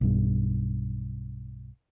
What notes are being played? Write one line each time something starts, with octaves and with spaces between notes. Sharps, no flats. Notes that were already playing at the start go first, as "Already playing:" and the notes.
B1 G2